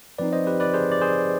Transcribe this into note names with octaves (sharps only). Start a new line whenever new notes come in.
F3 C4 D#4 B4 D5
C5 D#5
G4 B4
B4 D5
G#4 C5
D5
G#4 C5